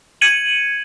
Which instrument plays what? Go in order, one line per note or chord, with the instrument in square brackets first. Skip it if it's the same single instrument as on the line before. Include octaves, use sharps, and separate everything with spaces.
[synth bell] G#6 C#7 D#7 F#7